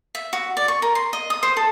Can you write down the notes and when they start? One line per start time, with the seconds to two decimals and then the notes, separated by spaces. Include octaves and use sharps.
0.15 E5
0.33 F#4
0.57 D5
0.68 C#6
0.82 A#4
0.95 C6
1.13 D#5
1.30 D#6
1.43 C5
1.57 A4